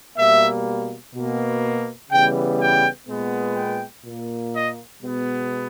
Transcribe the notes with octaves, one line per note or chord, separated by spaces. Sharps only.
B2 G3 A#3 E5
B2 A#3
C#3 E3 G3 B3 G5
G5
A#2 G#3 B3
G5
A#2 A#3
D#5
B2 G#3 B3